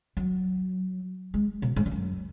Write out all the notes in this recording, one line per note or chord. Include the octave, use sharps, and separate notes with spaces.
F#3
G#3
B2
G#2
F2
F#2